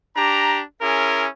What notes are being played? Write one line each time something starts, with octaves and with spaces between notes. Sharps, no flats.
D4 G4 A#5
C#4 E4 G#4 A#4